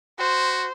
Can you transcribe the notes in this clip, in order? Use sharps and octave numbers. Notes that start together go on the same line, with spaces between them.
F#4 C5